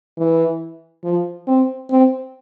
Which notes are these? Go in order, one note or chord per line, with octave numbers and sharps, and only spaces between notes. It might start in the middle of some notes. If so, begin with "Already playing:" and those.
E3
F3
C4
C4